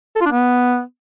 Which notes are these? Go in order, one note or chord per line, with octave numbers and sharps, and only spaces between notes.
A4
F4
D4
B3